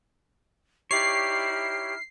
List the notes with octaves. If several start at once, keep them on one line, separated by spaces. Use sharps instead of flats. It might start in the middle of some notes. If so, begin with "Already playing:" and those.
D#4 E4 G4 C#5 D5 F6 C7